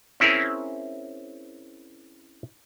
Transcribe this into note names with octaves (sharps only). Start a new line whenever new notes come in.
C4 C#4 E4 G#4 A#4